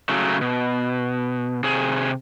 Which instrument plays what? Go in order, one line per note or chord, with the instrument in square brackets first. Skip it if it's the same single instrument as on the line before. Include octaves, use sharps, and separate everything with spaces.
[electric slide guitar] C#3 F#3 A3
B2
C3 G#4